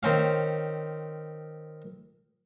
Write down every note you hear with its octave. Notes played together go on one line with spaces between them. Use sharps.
D#3 C4 C#4 F5